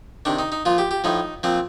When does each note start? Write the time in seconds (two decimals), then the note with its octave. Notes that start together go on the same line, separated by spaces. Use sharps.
0.25 C3 D#3 D4
0.39 D#4
0.52 D#4
0.65 A#2 F3 F4
0.78 G4
0.91 G4
1.04 A2 F3 D#4
1.43 A#2 F3 C4